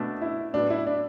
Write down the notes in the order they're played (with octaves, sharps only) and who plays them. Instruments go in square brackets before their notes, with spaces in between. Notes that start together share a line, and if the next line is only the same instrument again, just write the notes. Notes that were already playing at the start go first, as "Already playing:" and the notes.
Already playing: [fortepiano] B2 A3 D4
[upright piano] E4
[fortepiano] A2 F#3 B3 [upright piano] D4
[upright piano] E4
D4